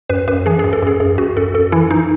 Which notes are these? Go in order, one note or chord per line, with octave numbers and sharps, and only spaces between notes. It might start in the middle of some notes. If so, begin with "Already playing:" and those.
F#2 B4
F#2 B4
E3 G#4
F#2 G#4
A4
F#2 G#4
F#2 G#4
F#2 F#4
F#2 A4
F#2 A4
E3 E4
E3 D#4